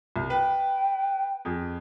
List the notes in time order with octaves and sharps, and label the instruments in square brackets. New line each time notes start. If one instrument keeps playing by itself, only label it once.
[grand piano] C2
[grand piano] B4 [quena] G5
[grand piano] F2 G#4